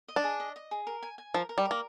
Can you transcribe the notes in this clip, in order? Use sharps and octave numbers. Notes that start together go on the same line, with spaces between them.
D#5
D4
G#4
D#5
D#5
G#4
A#4
G#5
G#5
F3 A#4
A#4
G3
A#4
A#3